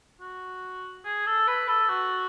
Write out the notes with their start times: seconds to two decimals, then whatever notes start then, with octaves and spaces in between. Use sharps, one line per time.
0.20 F#4
1.04 G#4
1.26 A4
1.47 B4
1.68 A4
1.89 F#4